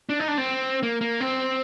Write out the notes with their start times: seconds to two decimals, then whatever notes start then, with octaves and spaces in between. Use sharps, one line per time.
0.09 D4
0.20 D#4
0.28 D4
0.38 C4
0.83 A#3
1.01 A#3
1.21 C4